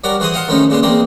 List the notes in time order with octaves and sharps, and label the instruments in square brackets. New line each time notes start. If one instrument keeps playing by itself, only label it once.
[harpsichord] F#3 G3 F#4 A#4 D5
E3 F#4 G#4 C5 D#6
D#5 F5 F#5 A5 C6
D#3 F3 G#3 A3 C#4 D#4
A#2 C#3 G#3 B3 C5
E2 A#2 G#3 A#3 C4 C6